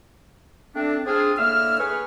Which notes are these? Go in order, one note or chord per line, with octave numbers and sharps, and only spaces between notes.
A3 C4 D4
C4 D4 F4 G#4
A2 D3 A#3 E5 E6 F6
G#4 B4 C#5 F6